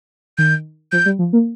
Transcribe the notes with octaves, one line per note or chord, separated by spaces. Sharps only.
D#3 G6
F3 G6
G3
F3
A#3